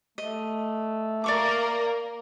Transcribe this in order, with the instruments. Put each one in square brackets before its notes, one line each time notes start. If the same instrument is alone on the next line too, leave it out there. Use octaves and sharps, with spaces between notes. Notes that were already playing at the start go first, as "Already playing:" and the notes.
[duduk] A3 [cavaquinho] D#5
[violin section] A#3 A#4 [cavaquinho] D5 C#6 D6